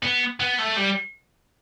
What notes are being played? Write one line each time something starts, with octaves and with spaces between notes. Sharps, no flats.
B3
B3
A3
G3